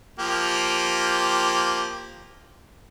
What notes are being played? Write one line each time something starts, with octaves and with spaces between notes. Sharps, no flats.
F3 A#3 G4